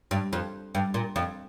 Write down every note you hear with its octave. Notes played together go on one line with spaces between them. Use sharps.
G2
F2
G2
A#2
F2